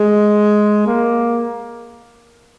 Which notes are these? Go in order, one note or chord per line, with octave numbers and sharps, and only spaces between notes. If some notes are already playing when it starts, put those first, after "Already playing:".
Already playing: G#3
A#3